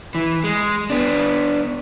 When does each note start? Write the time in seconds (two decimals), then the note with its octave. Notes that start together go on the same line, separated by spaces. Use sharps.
0.15 E3
0.44 G#3
0.90 B3 D4